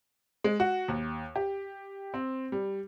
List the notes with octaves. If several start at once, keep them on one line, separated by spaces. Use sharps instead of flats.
G#3
F#4
D#2
G4
C4
G3